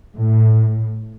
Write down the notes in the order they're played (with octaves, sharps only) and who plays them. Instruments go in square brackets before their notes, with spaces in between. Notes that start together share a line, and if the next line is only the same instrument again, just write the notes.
[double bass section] A2